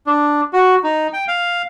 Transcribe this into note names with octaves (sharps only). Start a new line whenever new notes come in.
D4
F#4
D#4
G5
F5